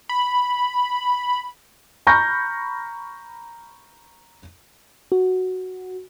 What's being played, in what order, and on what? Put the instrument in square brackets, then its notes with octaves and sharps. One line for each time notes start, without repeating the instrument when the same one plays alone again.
[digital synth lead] B5
[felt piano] A#5 B5 C#6 F6 G6 A#6
[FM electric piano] F#4